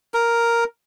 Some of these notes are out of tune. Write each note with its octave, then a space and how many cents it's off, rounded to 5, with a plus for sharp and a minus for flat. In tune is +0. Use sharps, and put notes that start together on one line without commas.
A#4 +0